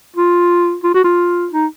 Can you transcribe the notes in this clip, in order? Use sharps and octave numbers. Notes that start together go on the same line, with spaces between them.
F4
F4
F#4
F4
D#4